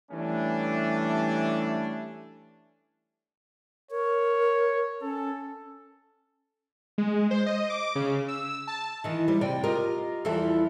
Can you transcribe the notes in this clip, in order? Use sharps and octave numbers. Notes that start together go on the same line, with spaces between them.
E3 G3 A3 C#4 D4
A#4 C#5
C#4 A4
G#3
C5
D#5
D6
C#3
E6
A5
D#3 E3 D#4
E3 G3 C5
C3 D5 G5
F4 G4 A#4 D#5
E2 E3 F3 G3 A4 E5